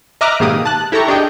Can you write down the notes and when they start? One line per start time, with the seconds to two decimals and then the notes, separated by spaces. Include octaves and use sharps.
0.21 D#5 E5 A#5 D6 F6 F#6
0.40 G#2 B2 D#3 A#3 G4 D#6
0.65 A5 F#6
0.92 E4 G4 A4 G5 A#5 C#6
1.08 D4 G4 G#4 D#5 G5